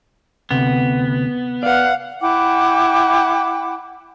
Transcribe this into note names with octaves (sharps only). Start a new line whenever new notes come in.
D2 C3 B3
B4 D5 F5 F#5
E4 F#5 G5 D6